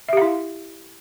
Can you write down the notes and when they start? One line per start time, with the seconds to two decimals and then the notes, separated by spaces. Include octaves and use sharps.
0.09 E5
0.13 G4
0.17 F5
0.22 E4